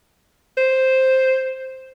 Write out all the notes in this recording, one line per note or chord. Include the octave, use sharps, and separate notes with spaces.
C5